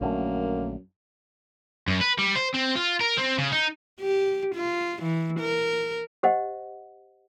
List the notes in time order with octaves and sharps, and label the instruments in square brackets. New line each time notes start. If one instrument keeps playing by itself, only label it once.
[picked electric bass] A#1 D3 A3 [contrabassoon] F#2 [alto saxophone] A#3
[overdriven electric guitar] F#2
B4
G3
C5
C4
F4
A#4
C4
C#3
D#4
[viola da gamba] G4
F4
E3
A#4
[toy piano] G4 C5 D#5 F#5